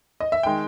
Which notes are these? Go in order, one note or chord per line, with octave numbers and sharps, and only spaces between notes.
D#5
E5
D#3 G#3 G5